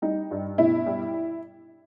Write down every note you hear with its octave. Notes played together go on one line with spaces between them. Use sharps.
G3 D#4
G2
B2 E4
G3